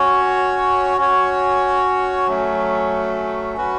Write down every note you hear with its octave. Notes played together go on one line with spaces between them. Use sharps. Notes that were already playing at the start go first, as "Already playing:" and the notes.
Already playing: C#4 F#4 C#5
C#4 F#4 C#5
F#3 A3 C#4
C#4 F#4 B4